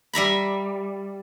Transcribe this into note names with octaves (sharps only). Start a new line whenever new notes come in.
G3 E5 A#5 B5